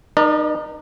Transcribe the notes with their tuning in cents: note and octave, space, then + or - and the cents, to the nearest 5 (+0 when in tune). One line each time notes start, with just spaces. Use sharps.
D#4 -30 A#4 +45 D5 +20